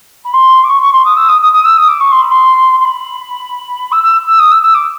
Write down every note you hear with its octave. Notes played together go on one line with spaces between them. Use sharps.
B5
C6
D6
C#6
C#6
C6
D#6
E6
D#6
D#6
D#6
E6
D#6
D6
C#6
C6
B5
C6
C6
B5
E6
E6
E6
D#6
E6
E6
D6